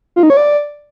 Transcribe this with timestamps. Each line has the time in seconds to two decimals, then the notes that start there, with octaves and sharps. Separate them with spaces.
0.16 F4
0.23 D#4
0.30 C#5
0.37 D5